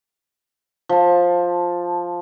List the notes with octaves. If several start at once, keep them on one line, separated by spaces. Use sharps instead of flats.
F3 A5